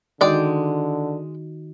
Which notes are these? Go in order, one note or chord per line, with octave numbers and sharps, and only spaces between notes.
D3 D#3 G#3 D#4 F#4 D5 G5